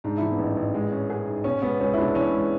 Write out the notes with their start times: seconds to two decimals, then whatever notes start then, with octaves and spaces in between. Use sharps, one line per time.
0.04 G#2 D4
0.18 E3 E4
0.31 B3 D4
0.39 A1
0.56 A1
0.74 G#3
0.92 C#4
1.10 G#4
1.27 G#2
1.44 B2 C#4
1.62 G#3 B3
1.80 C#2 C#4
1.94 E4
1.98 C#2 B3 D4
2.15 E3 C#4
2.33 G#3